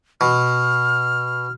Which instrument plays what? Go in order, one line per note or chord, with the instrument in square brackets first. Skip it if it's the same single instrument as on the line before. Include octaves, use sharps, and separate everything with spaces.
[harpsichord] B2 [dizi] F6